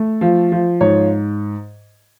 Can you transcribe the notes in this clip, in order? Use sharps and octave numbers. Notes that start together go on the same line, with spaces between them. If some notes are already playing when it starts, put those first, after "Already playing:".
Already playing: A3
F3
F3
G#2 C#5